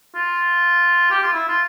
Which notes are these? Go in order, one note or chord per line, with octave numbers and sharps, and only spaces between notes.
F4
G4
F4
E4
F4